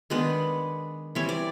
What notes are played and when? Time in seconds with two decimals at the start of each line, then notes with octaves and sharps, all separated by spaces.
0.10 D#3 G#3 B3 D4 B4
1.15 E3 G3 C4 C#5
1.29 D5